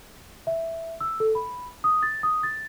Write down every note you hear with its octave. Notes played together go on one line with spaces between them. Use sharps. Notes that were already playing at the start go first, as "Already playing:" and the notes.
E5
E6
A4
B5
D#6
A6
D#6
A6